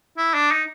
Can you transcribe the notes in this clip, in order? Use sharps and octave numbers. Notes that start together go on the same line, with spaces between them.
E4
D4
D#4